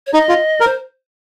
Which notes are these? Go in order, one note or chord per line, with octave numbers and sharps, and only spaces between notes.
C#5
D#4 D#5
F4
A#4
C5